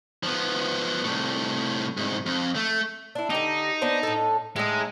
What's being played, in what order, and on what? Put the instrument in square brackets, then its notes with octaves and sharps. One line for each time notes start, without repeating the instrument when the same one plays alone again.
[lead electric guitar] F3 B3
C2 A2
C2 G#2
F2
A3
[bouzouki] D4 E4
[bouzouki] D3 G4 [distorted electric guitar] D#4
[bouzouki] B3 D4 C5
A2 A4
[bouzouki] A2 D#4 [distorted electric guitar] G#3